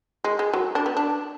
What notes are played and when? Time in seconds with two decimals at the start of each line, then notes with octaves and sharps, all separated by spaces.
0.24 G#3
0.39 G#3
0.53 F#3
0.75 D4
0.86 B3
0.97 D4